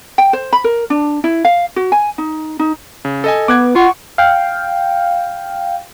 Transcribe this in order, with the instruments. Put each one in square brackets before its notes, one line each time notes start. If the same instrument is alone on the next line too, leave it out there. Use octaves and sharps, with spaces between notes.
[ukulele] G5
C5
B5
A#4
D4
E4
F5
F#4
G#5
D#4
D#4
[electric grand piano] C#3
A4 D#5 G#5
[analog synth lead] B3 [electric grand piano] D6 F#6 G#6
[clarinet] F4 [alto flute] F#5 [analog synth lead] C#6
[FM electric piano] F5 G5